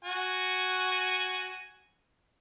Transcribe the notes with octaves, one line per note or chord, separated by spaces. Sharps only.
F#4 G#5